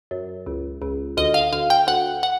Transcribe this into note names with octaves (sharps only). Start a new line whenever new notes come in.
F#2
C#2
C#2
D2 D#5
F5
D2 F5
G5
D2 F#5
F#5